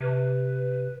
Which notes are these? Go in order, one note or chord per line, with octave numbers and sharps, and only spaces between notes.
C3 B4